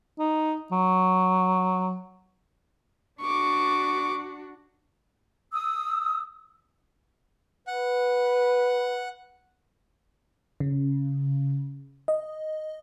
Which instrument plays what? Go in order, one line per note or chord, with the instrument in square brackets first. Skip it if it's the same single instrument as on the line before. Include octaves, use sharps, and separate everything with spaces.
[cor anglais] D#4
F#3
[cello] D4 F#4 [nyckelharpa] C#6 D6
[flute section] D#6 E6
[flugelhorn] B4 [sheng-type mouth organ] F#5
[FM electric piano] C#3
D#5